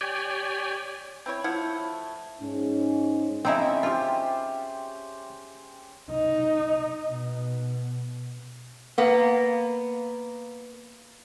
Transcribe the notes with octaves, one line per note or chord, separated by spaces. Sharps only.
G4 C#5 D5 G5 G#5
C4 E4 C#5
F3 A3 E4 F#5
G#2 C#4
C#3 C4 D#4 E4 E5 G5
F4 G4 C5
D#4
B2
A#3 B3